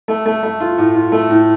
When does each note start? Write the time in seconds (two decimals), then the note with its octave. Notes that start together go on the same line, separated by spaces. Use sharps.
0.08 A3
0.26 A3
0.43 A3
0.60 F4
0.78 A2
0.95 F4
1.12 A3
1.30 A2